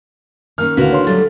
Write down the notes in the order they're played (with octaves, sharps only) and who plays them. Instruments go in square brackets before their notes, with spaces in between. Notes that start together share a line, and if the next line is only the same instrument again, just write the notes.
[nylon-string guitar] D#3 A#3 C#4 [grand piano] F6
[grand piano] D2 [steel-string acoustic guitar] D3 E4 F#4 [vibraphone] B4 F5
[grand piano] C#5 C6
[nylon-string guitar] F#3 [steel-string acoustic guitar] G3 A3 [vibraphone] A4